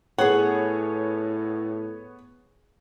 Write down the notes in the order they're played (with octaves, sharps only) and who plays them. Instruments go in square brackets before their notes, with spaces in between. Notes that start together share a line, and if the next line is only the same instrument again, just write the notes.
[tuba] A2 [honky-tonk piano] B3 C#5 [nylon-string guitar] G#4 F#5